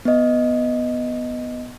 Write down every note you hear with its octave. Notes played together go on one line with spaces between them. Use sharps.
B3 D#5